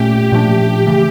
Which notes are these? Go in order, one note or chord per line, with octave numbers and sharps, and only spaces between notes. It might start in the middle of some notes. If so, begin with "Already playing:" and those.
Already playing: A#2 A3 C#4 G4
A#2 F3 A3 D4
C#3 E3 A3